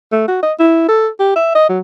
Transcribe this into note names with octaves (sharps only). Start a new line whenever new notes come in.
A3
F#4
D#5
E4
A4
G4
E5
D#5
F#3